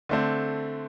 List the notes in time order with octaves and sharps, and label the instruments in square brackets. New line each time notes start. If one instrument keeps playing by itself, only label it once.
[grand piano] D3 A3 C4